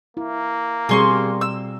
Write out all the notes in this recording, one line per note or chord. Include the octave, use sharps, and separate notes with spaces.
A#3 E4
B2 G3 C4 G#4 C6 C#6
E6